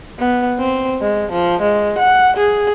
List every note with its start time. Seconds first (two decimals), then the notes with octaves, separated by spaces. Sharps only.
0.19 B3
0.59 C4
1.01 G#3
1.32 F3
1.61 G#3
1.98 F#5
2.37 G#4